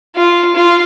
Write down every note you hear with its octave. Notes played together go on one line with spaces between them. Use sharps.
F4
F4